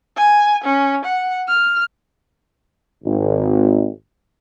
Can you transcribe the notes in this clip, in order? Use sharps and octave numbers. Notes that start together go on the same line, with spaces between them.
G#5
C#4
F#5
F6
G#1